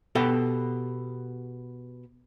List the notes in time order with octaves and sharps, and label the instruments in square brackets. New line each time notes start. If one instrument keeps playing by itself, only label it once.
[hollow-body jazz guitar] B2 B3 G4 A4 G5